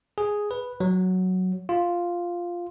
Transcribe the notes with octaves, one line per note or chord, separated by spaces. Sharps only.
G#4
B4
F#3
F4